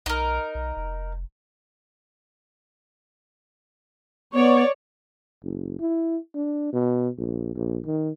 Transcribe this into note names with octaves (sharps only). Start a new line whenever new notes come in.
B1 D#4 A#4
B1
F1
B3 C#5 D5
F#1
E4
D4
B2
A#1
A#1
D#3